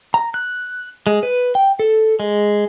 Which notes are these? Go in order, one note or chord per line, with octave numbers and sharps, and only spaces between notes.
A#5
F#6
G#3
B4
G5
A4
G#3